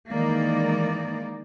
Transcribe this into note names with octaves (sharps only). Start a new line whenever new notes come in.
D#3 E3 G#3 A#3 D#4 D5